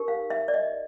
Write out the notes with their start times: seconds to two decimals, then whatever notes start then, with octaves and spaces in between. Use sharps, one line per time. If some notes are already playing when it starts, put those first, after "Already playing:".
Already playing: D#4 G4 A#4
0.08 F5
0.30 E5
0.48 D5
0.54 D#5